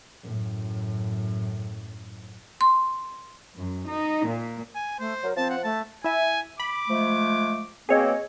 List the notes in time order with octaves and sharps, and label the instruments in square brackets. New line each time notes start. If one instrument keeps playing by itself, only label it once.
[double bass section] F#2 A2
[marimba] C6
[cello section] F#2
D#4
A#2
[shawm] G#5
[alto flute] A3 [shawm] C5
[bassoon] F#3 [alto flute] A#4
[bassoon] F3 [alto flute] C4 [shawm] A5
[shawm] F#5
[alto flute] A3 [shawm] A5
[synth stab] E4 E5 [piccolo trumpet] G#5
[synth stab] B5 [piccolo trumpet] D6
[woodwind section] F3 G#3 A3
[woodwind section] B2 A#3 C4 [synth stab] G#4 C#5 D#5